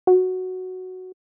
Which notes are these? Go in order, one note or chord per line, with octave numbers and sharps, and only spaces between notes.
F#4